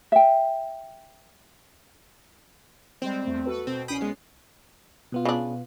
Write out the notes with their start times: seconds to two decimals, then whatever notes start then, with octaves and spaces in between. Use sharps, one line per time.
0.12 E5 G5
3.02 G3 G#3 C4 C5
3.25 E2 A3
3.46 F#4 A4 B4
3.67 B2 C4
3.88 C2 C#4 G5 B5 D#6 C7
4.01 G#3 B3
5.12 B2 B3 F4
5.25 C#3 D4